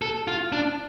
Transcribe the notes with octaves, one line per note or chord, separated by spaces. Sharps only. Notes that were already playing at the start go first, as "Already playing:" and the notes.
A4
F4
D4